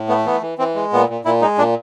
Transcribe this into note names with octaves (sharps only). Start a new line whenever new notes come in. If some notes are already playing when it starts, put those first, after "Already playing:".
Already playing: A2
A3 B3
E3 B3
E3
E3 C4
G#3
A#2 B3
A#2
A#2 E4
G#3 D#4
A#2 D4